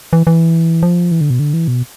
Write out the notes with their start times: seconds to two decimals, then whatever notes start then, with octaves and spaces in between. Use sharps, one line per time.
0.13 E3
0.27 E3
0.83 F3
1.12 E3
1.21 D3
1.30 B2
1.39 D3
1.54 E3
1.68 B2